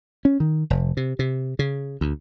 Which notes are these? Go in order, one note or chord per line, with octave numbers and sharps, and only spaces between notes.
C#4
D#3
F1
C3
C3
C#3
D2